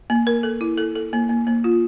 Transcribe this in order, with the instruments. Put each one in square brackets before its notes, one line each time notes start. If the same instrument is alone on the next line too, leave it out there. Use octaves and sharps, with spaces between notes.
[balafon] A#3
A#4
A4
E4
A4
A4
A#3
A#3
A#3
F4